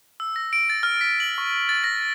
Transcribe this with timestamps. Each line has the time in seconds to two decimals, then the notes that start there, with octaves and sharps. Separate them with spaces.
0.20 E6
0.36 A#6
0.53 D7
0.70 A6
0.83 F6
1.01 B6
1.20 F#7
1.38 C#6
1.69 A6
1.84 A#6